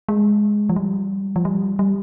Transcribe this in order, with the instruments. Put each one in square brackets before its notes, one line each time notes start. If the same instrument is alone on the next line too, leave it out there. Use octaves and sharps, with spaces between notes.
[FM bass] G#3
F3
G3
F3
G3
G3